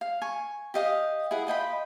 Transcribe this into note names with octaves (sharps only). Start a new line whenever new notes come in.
F5
G#5 C#6
G4 D#5 F5 D#6
E4 G#4 F#5
F4 D#5 G5 B5